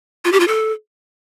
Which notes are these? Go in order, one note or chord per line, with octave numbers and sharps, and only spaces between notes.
F4
G4
F4
A4